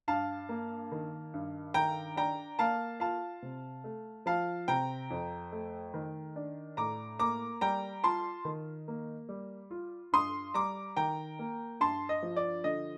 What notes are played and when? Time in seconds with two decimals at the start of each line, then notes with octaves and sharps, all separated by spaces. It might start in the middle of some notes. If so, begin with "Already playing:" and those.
0.08 G2 F5 A5
0.49 A#3
0.92 D#3
1.34 G2
1.74 D#3 G5 A#5
2.16 D4 G5 A#5
2.59 A#3 F5 A5
3.00 F4 F5 A5
3.42 C3
3.84 A3
4.26 F3 F5 A5
4.68 C3 G5 A#5
5.10 F2
5.52 A3
5.94 D#3
6.36 D4
6.77 A2 A#5 D6
7.19 A#3 A#5 D6
7.61 G3 G5 A#5
8.04 F4 A5 C6
8.45 D#3
8.88 A#3
9.29 G3
9.71 F4
10.12 G2 C6 D#6
10.54 G3 A#5 D6
10.97 D#3 G5 A#5
11.39 A#3
11.80 G2 A5 C6
12.09 D#5
12.23 F3
12.36 D5
12.64 D3 D#5